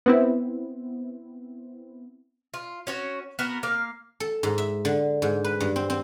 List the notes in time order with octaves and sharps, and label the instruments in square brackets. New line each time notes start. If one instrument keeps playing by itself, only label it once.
[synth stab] B3 C4 E4
[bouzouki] F4
C#4 F#4 C#5
B3 F#4 A#4
A#3 F5
[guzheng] A4
G#2
E5
D3
G#2
B4
G2
C4
C4